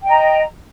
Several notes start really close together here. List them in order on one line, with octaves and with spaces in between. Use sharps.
G5 D#5 A#5